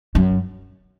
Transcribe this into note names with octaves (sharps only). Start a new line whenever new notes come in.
F#2